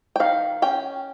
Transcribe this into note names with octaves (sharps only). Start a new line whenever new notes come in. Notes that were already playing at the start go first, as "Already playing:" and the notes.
G5
D#3 F5
C#4 G5